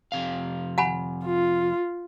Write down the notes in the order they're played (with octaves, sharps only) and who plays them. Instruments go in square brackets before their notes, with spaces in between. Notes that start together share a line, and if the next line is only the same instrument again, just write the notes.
[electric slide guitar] F2 C3 F5
[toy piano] F#5 G#5 B5
[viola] F4